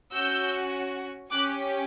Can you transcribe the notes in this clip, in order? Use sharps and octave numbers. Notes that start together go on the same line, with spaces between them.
C#4 F#4 E6 G6
C#4 G4 D6 F#6